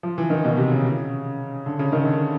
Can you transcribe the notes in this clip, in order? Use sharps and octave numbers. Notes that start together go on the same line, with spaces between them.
F3
E3
D#3
B2
C3
C#3
D3
C#3
D#3
D3